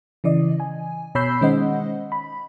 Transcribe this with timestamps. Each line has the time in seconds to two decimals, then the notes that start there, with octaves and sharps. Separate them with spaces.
0.24 C#3 E3 D5 D#5
0.60 G#5
1.15 B2 C#5 B5 E6 G6 C7
1.41 D#3 G#3 C#4 C5 D#5 F#5
2.12 B5